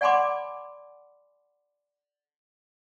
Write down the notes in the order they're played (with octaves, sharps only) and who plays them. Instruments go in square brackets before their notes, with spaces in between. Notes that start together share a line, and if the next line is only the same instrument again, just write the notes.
[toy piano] D5 F#5 G#5 B5 C6 D6